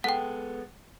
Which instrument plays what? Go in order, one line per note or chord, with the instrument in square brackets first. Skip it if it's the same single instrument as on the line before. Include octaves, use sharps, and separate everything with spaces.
[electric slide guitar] G#3 B3 A4 [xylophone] F#5 G5